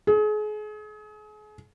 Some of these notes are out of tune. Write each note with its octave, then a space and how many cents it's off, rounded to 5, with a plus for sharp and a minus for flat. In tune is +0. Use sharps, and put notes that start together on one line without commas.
G#4 +35